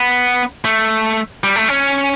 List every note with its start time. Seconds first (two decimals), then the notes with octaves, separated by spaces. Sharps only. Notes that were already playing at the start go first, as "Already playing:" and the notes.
Already playing: B3
0.65 A3
1.44 G3
1.56 A3
1.68 C#4